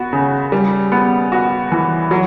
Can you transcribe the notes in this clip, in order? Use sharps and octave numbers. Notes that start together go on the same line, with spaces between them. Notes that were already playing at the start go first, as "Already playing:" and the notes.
Already playing: B3 F#4
C#3
G3
B3
F#4
E3
F#3